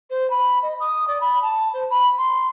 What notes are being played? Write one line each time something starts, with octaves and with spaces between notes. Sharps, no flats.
C5
B5
D#5
D#6
D5
B5
A5
C5
B5
C6